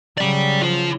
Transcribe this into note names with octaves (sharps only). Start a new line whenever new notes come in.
C#3 F#3 D5 G5
F4 C5